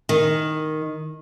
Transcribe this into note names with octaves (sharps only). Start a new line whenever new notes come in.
D#3